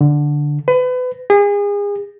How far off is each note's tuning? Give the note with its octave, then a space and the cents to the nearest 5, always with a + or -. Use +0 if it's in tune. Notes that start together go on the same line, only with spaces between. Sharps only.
D3 +0
B4 +30
G#4 -35